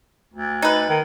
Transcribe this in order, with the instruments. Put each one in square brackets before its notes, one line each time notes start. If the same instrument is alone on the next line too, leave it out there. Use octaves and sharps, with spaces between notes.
[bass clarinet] D2
[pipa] D#4 B4
[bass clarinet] D#3